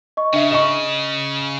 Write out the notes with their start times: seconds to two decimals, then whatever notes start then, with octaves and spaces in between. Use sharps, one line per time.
0.17 D#5 C#6
0.33 C#3 D4 E5
0.51 D#5 C#6 E7